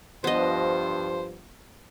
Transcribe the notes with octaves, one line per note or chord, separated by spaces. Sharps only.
G2 F3 B3 C5 D#5